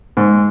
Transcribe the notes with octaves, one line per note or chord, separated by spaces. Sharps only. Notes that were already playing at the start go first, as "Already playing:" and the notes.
G#2